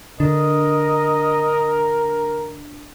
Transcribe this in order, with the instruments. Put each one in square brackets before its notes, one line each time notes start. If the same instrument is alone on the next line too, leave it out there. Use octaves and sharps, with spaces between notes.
[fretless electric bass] D3 [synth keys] D4 [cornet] A#4 [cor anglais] D#5